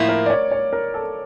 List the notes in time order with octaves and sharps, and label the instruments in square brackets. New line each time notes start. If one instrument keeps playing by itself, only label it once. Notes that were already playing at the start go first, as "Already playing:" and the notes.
Already playing: [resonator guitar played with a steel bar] A2 F3 A#3 E4
[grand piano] A#4
D5
C#5
C#5
A#4
A4